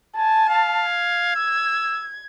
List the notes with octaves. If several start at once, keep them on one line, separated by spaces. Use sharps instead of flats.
G#5 A5
F5
G#6
E6